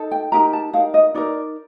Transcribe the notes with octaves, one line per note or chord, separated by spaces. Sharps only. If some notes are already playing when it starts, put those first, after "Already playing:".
Already playing: D#4 A4
G5
D#4 G4 A#4 A#5
A5
D#4 A#4 F5
D#5
D#4 A#4 D5